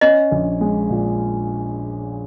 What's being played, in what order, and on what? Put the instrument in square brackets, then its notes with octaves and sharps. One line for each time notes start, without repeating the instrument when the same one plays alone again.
[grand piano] C#4 [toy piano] D#5
[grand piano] A#1
G#3
A#2